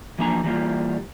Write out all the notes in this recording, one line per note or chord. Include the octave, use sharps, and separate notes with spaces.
E3 F3 A#3 D4 G#5 A#5
E3 G3 A#3 F4